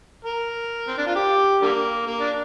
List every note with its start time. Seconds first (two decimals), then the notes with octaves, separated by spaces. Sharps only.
0.25 A#4
0.88 C4
0.98 D4
1.07 F4
1.15 G4
1.62 D3 G3 A#3
2.07 A#3
2.20 D4